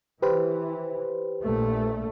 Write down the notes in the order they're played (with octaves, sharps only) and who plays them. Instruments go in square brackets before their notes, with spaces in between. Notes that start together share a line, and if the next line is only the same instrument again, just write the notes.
[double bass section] E3 [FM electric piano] G4 B4 C5
[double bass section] A#1 A#2 A3